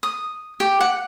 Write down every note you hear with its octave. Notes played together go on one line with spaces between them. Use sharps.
D#6
G4
F#5